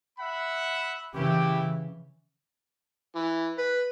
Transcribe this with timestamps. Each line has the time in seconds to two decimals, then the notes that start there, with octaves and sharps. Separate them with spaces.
0.18 E5 F#5 B5
1.14 C#3 E3 E4 G4
3.15 E3
3.58 B4